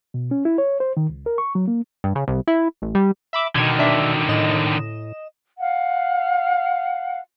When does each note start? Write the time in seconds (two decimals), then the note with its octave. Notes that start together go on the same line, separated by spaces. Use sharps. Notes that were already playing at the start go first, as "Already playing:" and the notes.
0.14 B2
0.31 C#4
0.45 E4
0.58 C#5
0.80 C5
0.97 D#3
1.09 C#2
1.26 A#4
1.38 C#6
1.55 F#3
1.68 A#3
2.04 G2
2.15 C#3
2.28 C2
2.48 E4
2.82 A1
2.95 G3
3.33 E5 B5 D6
3.55 B2 D3 D#3 G#6
3.79 D4 E5
4.29 A2 D#5 E7
5.59 F5 F#5